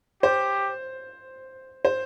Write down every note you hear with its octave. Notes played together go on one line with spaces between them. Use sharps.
G4 C5
C5